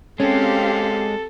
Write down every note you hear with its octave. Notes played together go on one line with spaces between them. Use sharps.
G#3 C4 C#4 G4 A4 F5